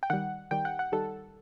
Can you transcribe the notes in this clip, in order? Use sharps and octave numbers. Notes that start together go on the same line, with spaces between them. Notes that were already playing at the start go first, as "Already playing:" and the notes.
G5
D#3 G3 F#5
D#3 G3 G5
F#5
F#5
D#3 G3 A4